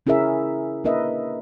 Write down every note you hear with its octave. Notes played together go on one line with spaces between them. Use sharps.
C#3 C#4 E4 G#4 A#4 E5
A#3 D4 A#4 B4 D#5 E5